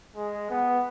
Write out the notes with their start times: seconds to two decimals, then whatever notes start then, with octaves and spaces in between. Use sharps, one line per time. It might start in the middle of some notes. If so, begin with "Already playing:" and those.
0.16 G#3
0.50 B3